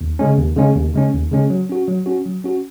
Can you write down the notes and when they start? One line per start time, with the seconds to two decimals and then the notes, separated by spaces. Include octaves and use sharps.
0.01 D#2
0.19 C#3 G#3 C#4
0.38 D#2
0.57 C#3 G#3 C#4
0.76 D#2
0.94 C#3 G#3 C#4
1.13 D#2
1.32 C#3 G#3 C#4
1.50 F#3
1.69 C#4 F#4
1.88 F#3
2.06 C#4 F#4
2.26 F#3
2.44 C#4 F#4